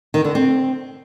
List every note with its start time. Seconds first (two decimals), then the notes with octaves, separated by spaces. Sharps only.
0.14 D#3
0.25 D3
0.35 C4